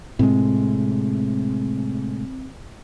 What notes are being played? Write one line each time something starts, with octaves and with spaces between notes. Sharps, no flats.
A2 C3 G#3 C4